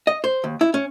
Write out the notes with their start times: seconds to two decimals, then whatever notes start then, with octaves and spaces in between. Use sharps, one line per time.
0.07 D#5
0.24 C5
0.44 D#2
0.61 E4
0.74 C#4